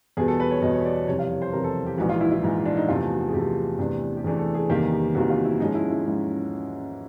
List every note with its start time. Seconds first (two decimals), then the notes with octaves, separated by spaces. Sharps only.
0.17 E2 B2 G3 B3 G#4
0.28 A4
0.40 B4
0.51 C#5
0.62 E2 B2 G3 B3 D#5
0.73 C#5
0.85 D5
0.96 C#5
1.07 F2 C3 E3 G3 C#5
1.19 F5
1.31 C#5
1.42 C5
1.53 F2 C3 E3 G3 A#4
1.64 A4
1.87 G4
1.98 A#1 G#2 E3 F#4
2.09 F4
2.20 E4
2.31 E4
2.43 A#1 G#2 E3
2.66 D4
2.77 D#4
2.88 E2 C3 F3 A3 F4
3.11 F#4
3.29 G#4
3.34 E2 C3 F3 A3 G4
3.79 E2 C3 E3 A3 D4
4.17 G4
4.24 E2 C3 E3 A3 D4 G#4
4.39 A4
4.55 G#4
4.69 E2 C3 D#3 G3 A#3 G4
4.92 G4
5.15 E2 C3 D#3 G3 A#3 F#4
5.30 F4
5.45 E4
5.60 G#2 F3 G#3 C#4 D#4
5.75 E4
5.90 E4
6.05 G#2 F3 G#3 C#4